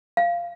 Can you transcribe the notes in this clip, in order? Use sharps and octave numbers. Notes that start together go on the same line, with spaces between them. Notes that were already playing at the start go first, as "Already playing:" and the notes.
F5